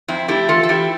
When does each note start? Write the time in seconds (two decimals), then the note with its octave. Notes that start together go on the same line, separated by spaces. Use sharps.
0.08 F2 C4 E4
0.28 A3 E4 G4
0.49 E3 F4 A4
0.63 A4
0.69 E3 E4 G4